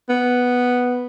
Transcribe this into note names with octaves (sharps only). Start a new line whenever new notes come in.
B3